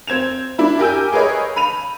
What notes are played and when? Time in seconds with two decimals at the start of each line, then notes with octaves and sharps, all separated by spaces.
0.07 C4 G#6 E7 F7
0.58 D4 E4 B5
0.79 G4 A#4 G#5 E6 G6
1.12 G#4 A#4 B4 C#5 D#5
1.56 B5 D#7 F7